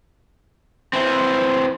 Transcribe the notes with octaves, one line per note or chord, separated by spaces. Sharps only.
E3 C4